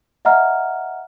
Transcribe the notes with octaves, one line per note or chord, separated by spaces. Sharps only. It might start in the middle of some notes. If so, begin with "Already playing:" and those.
D#5 E5 F#5 A#5 F6